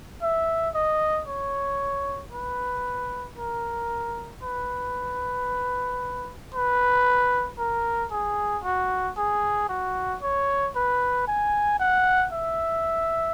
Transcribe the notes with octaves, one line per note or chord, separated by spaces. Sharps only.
E5
D#5
C#5
B4
A#4
B4
B4
A#4
G#4
F#4
G#4
F#4
C#5
B4
G#5
F#5
E5